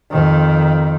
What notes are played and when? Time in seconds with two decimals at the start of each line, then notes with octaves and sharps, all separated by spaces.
0.11 F2 D#3